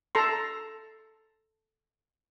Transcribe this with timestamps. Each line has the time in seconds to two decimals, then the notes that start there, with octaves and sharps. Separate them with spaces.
0.15 A4 A#5 C6